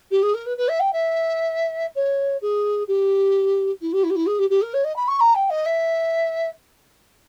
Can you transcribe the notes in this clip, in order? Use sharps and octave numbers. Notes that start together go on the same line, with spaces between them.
G4
G#4
A#4
B4
B4
E5
G5
E5
C#5
G#4
G4
E4
G4
E4
G4
E4
G#4
G4
G4
A#4
C#5
D#5
B5
C#6
A#5
G5
D#5
E5